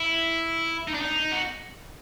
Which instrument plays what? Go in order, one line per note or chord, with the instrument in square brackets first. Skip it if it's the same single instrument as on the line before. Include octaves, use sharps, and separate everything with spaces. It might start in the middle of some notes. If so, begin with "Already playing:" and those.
Already playing: [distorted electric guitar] E4
D#4
D4
D#4
F#4